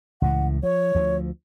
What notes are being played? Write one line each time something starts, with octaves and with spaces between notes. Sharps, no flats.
C#2 A2 E3 F#5
F3 C#5
D2 F3